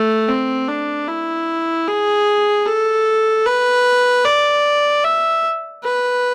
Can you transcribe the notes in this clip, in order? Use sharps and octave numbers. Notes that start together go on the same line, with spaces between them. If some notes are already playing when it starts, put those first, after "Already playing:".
Already playing: A3
C4
D4
E4
G#4
A4
B4
D5
E5
B4